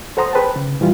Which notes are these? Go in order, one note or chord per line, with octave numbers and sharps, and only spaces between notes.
A4 C5 F#5 A#5 C6 D#6
G#4 B4 C5 G5 A5
C#3
A#2 E3 G3 F4